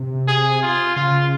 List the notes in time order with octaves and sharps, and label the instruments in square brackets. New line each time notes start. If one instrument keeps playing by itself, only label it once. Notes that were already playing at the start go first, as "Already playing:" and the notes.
Already playing: [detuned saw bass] C3
[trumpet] G#4
F4
[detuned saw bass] C#3 [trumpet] F4